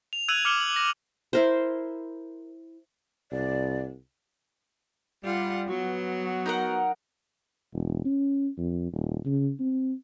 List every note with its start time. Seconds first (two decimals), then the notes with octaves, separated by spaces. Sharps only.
0.13 F7
0.28 E6 F#6 G#6 D#7 F7 F#7
0.45 D6 F6 C#7 F#7 G7
0.61 F#7
0.75 A#6 F#7
1.33 E4 A#4 C5
3.32 C2 D5
5.24 G3 F4 F#5
5.69 F#3 B3 F#4
6.46 D#4 A#4 F#5
7.74 E1
8.05 C#4
8.58 F2
8.93 D#1
9.25 C#3
9.60 C4